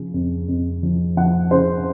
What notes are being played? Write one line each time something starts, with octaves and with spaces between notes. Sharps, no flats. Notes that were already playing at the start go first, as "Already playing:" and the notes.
Already playing: C#3 F3
F2
F2
F3
F3 F#5
C#3 C5